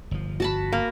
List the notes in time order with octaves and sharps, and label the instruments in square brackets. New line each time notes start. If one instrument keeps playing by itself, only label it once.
[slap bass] G1 F3
[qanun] F#4 A5 B5
[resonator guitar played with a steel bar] A#3